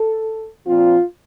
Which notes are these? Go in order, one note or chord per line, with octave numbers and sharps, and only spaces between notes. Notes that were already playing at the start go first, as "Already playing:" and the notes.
Already playing: A4
A#2 F3 C4 F4